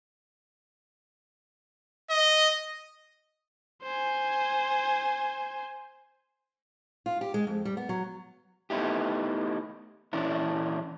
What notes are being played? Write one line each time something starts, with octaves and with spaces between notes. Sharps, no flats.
D#5
C5 G#5
F4
G4
G#3
F2
G3
B3
F#3
A3 B3 D#4 E4 G4
A#2 E3 C#4 D4 E4